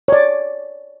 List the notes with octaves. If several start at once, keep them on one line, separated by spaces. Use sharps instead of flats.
C#5 D5